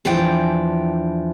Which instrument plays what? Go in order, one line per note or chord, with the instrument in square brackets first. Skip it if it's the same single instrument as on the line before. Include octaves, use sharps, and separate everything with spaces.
[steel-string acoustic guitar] E2 E3 F3 D4 G5